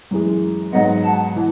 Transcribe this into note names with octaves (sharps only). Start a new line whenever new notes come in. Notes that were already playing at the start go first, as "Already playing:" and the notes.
F#2 E3 G#3
G#2 F#3 B3 D#5 F#5
F#5 A5
E3